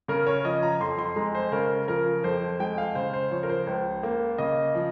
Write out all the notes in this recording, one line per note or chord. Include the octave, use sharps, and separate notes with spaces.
C#3 A#4
C#5
F3 D#5
A#5
F2 C6
C6
G#3 A#5
C5
C#3 A#4
F3 A#4
F2 C5
G#3 G5
F5
C#3 C5
C5
F3 C#5
A#4
C5
C#2
A#3
C#3 D#5
F3